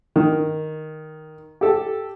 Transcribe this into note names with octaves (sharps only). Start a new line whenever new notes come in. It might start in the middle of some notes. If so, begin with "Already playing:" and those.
D#3
G4 A4